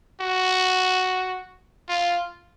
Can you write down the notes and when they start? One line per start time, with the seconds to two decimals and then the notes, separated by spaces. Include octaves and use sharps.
0.21 F#4
1.89 F4